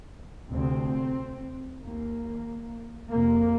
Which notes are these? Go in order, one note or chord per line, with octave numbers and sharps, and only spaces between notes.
D2 C3 C4
D#2 A#3
F2 C3 A#3